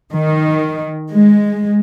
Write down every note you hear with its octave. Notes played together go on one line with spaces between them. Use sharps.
D#3
G#3